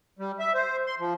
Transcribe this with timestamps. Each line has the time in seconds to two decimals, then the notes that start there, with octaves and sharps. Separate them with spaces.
0.19 G3
0.39 E5
0.54 C5
0.87 C6
0.99 F3